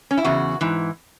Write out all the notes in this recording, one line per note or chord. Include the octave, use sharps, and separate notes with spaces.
C#4
E4
E2 C#3 F#4
G#2 E3